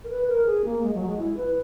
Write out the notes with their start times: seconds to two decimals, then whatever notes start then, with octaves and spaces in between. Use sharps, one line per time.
0.04 A#4
0.10 B4
0.28 A#4
0.46 G#4
0.65 A#3
0.83 G#3
0.94 F#3
1.06 G#3
1.18 E4
1.37 B4